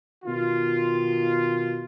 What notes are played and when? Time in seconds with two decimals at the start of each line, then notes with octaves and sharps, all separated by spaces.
0.25 B2 D#3 F4